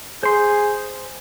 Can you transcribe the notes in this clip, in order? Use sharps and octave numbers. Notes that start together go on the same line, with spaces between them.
G#4 C5 C6